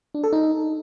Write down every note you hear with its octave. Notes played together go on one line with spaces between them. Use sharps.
D4
A4
D#4